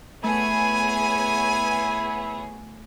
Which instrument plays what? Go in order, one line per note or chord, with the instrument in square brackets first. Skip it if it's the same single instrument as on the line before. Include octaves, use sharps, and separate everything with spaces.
[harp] A3 [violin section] B3 G#4 C#5 [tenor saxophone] E4 [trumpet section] G#5